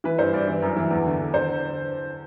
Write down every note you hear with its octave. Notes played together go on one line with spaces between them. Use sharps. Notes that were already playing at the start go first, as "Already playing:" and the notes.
E3 B4
G2 C5
G2 D5
E3
F#2
E3
E2
D3
D3
D3 C5